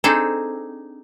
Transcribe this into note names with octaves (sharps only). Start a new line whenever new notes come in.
C4 D4 D#4 G#4 A4